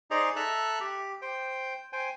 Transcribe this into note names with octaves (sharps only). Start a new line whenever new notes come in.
D#4 G#4 C5 D5 D#5 A#5
A4 E5 A#5 F#6
G4
C5 G5
C5 G5 G#5